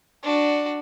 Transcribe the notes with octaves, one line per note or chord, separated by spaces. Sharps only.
D4 F#4